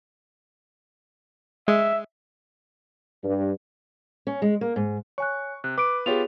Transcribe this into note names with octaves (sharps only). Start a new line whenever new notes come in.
G#3 E5
G2
C#4
G#3
A#3
G#2
C#5 G#5 C#6 F#6
C3 F#6
B4 D6 D7
B3 F4 G4 G#4 C#5 F7